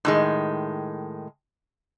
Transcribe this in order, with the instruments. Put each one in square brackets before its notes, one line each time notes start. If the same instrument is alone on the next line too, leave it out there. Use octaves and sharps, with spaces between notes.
[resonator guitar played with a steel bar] A2 D#3 G#3